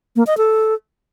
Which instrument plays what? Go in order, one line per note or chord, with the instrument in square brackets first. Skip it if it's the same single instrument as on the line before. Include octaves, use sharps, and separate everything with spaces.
[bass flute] A#3
D#5
A4